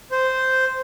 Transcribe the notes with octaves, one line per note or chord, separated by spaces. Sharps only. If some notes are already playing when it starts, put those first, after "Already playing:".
C5